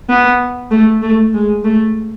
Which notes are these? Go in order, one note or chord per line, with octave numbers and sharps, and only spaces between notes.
B3
A3
A3
G#3
A3